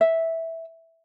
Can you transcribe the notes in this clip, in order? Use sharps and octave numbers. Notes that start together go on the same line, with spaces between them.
E5